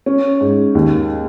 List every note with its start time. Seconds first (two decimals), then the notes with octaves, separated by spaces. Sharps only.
0.06 C#4
0.41 G#2
0.75 D#2